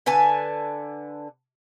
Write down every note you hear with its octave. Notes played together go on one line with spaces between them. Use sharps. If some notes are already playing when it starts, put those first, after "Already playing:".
D3 B4 G#5 A5